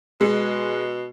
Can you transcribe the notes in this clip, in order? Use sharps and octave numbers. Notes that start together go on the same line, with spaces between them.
B2 G#3